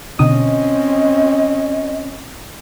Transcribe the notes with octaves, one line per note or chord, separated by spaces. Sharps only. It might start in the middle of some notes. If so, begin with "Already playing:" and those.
B2 D3 C4 C#4 D#5 D#6